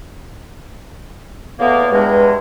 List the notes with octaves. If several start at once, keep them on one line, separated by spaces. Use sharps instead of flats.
E2 A2 A#3 B3
E2 G2 G#3